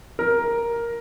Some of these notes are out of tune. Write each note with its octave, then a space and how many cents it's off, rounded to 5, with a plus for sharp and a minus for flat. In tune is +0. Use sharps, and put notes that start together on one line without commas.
A#4 +5